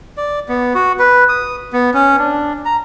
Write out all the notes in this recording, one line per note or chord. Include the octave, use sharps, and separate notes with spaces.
D5
B3
F#4
B4
D#6
B3
C#4
D4
A#5